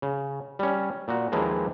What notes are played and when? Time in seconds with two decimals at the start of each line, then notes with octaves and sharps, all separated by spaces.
0.02 C#3
0.59 G3 C#4
1.08 A#2 F#4
1.32 D#2 E3 F3 G#3 A#3